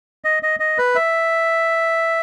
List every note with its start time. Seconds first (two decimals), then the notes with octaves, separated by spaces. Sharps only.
0.25 D#5
0.43 D#5
0.60 D#5
0.78 B4
0.95 E5